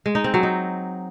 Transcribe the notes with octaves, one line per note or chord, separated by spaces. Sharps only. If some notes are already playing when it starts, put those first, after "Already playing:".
G#3
D#4
C4
F#3
D#4